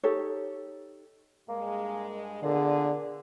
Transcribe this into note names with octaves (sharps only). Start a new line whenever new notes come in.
D#4 G4 A4 C#5
G2 G#3 A#3
A#2 D3 B3 G#4